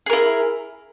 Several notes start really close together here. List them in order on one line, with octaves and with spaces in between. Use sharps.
G#4 A#4 E4